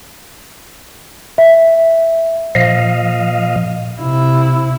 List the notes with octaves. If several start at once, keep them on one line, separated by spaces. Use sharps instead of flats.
E5
A#2 F3 D#5 F5
C3 E4